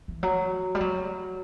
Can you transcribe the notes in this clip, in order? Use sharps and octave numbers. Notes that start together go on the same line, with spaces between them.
E3
F#3
G3
F#3